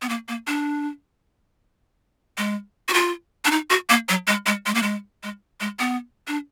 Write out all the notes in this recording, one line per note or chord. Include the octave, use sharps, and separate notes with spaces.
B3
A#3
A#3
D4
G#3
F#4
F4
D4
D#4
F#4
A#3
F#3
G#3
G#3
G#3
A#3
G#3
G#3
G#3
B3
D4